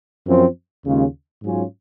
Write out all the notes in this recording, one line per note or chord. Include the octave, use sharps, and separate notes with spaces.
F#2 F3 C4
D#2 C#3 G#3 C#4 F4
G#2 F#3 C#4 F4